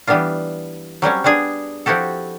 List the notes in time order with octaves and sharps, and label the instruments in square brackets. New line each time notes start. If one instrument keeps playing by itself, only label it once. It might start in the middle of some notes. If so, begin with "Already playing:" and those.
[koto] E3 G3 B3 D4 F4
F#3 G3 C4 C#4
G3 B3 D4 G#4
F3 C4 E4 F#4 G4 A4